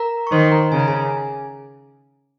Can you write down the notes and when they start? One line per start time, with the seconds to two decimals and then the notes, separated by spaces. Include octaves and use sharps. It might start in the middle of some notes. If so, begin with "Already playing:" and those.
Already playing: A#4 A#5
0.27 C#6
0.32 D#3 C5 C6
0.52 A#4 A#5
0.72 C#3 G#5
0.79 A#5
0.88 G#4 G#5